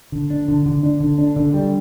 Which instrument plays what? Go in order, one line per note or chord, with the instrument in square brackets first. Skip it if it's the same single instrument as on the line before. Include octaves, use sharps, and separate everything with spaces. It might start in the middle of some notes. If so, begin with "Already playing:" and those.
[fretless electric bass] D3
D4
D3
D3
D4
D3
D4
D3
G3